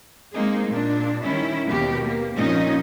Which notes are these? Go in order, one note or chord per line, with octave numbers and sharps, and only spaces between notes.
G#3 A#3 C4 D#4 G#4
A#2 D4
D#3 G3 C#4 E4
D#2 B2 G4 A#4
A#3
F2 A#2 C#4 D#4 D#5